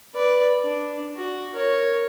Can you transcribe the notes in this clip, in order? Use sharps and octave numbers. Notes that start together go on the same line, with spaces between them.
B4 D5
D4
F#4
A#4 C#5